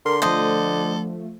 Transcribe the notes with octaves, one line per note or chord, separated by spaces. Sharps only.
D3 A#4 C6
F3 A3 A4 C5 D#5